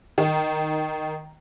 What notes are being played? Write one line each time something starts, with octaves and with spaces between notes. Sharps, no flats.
D#3